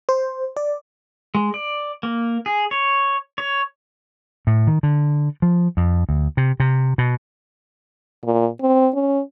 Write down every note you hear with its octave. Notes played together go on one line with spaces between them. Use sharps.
C5
D5
G#3
D5
A#3
G#4
C#5
C#5
A2
D#3
D3
F3
F2
D2
C3
C3
B2
A#2
C4
C#4